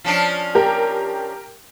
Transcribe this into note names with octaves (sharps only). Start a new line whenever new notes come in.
F3 C#4 D4
G4 A#4 G5